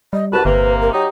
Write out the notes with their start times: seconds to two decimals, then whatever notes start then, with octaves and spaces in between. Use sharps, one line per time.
0.13 G3 D#5
0.32 C2 F#4 B4 A5
0.45 G1 C3 A#3 B4
0.81 A#4
0.92 F#3 D#4 G4